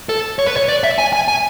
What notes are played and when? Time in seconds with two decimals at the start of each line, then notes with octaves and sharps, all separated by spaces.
0.09 A4
0.39 C#5
0.47 B4
0.56 C#5
0.68 D5
0.84 E5
0.98 G#5
1.13 G#5
1.28 G#5